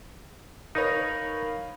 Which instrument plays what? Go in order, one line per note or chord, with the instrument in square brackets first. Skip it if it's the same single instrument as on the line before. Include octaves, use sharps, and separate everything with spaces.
[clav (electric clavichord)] D#4 [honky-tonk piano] A#4 B4 C#5 [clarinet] F5